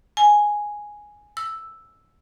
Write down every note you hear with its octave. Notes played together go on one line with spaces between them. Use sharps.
G#5
E6